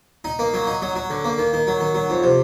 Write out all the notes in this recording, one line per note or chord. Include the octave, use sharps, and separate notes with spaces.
D#4
A#3
F#3
D#4
F#3
F#3
D3
A#3
D#3
D#3
F#3
D#3
F#3
F2
C3